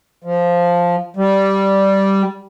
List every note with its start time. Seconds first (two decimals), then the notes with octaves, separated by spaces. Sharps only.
0.24 F3
1.17 G3